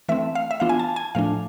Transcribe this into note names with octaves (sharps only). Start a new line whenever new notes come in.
E3 A3 C4 E5
F5
E5
E3 B3 D4 F4 F5
G#5
A5
G#5
A2 F3 A3 D4 F5